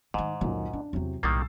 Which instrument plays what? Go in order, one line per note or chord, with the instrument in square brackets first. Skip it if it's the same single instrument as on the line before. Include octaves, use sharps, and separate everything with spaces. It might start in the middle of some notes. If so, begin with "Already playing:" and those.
[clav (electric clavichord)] G#2 [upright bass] D#3 D#4
[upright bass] C#2 D3 [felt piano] F#2 A#2 D#3
[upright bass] C#4 [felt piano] D4
[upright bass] E2 E3 [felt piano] C3 F#3
[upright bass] B1 A2 [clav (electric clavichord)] D#3 G3 A#3 [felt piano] E6 A6 C7